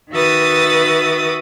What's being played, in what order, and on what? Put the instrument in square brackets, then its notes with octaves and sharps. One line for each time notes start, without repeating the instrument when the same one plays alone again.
[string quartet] D#3 F#4 B4 E5 D#6 A6